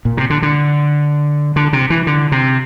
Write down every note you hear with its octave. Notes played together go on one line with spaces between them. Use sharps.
A#2
C3
D3
D3
D3
C3
E3
D3
C3